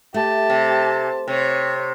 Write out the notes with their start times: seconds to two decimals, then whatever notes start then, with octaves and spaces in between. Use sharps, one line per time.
0.14 A3 G4 A5
0.50 C3
1.28 C3 C#5